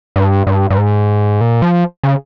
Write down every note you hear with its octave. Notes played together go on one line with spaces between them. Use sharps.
G2
G2
G2
G#2
A#2
F3
C#3